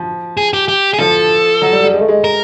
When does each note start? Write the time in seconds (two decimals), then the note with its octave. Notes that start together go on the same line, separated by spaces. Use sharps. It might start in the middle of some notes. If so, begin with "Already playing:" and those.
Already playing: F3
0.37 G#4
0.53 G4
0.68 G4
0.94 G#4
0.99 F3 A4
1.61 F#3
1.72 G3
1.83 G3
1.94 G#3
2.01 A3
2.08 G#3
2.24 A#4